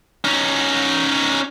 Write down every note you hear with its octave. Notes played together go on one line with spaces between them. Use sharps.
C#4 D#4